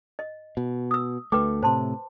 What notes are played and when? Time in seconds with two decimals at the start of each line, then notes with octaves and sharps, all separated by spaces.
0.19 D#5
0.57 B2
0.91 D#6 E6
1.32 D2 A3 B4 G5 D6
1.63 A2 C3 C5 A5 C6